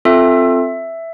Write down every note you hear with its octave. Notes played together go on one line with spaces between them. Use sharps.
C4 F4 A4 E5